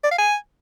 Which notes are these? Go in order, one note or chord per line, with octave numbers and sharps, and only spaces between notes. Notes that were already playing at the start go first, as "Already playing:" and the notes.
D5
F5
G#5